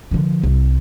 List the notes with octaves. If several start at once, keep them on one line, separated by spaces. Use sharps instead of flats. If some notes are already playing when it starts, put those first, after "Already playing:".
D3 F3
C2